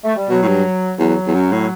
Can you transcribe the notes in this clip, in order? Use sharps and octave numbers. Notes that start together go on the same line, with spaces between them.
A3
G3
B2 F#3
A2
G2
E2 F#3
E2
F#2
A2